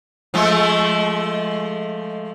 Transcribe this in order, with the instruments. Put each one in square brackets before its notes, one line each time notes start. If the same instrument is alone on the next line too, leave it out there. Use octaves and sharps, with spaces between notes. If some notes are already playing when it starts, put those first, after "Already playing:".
[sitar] F3 G#3 A3